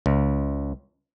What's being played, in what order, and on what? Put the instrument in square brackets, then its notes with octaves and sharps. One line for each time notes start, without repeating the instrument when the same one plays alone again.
[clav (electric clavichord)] C#2